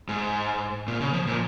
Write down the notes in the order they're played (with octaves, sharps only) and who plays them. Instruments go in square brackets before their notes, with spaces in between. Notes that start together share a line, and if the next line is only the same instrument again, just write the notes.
[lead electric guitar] G#2
A#2
C#3
F3
A#2